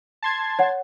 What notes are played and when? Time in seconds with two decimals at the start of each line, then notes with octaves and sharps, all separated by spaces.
0.22 A5 C6 G#6
0.59 C#5 F#5